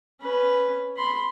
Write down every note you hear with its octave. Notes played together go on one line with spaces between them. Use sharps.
C#4 B4
B5 C6